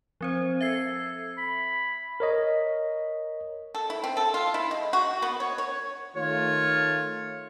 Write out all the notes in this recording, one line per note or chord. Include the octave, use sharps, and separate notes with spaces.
F3 C4 C5
A4 E5 G#6 C7
B5
A#4 C#5 D#5
A4
E4
C4
A4
F4
E4
G#3
F#4
B3
C#5
C#5
D#3 A3 F4 C#5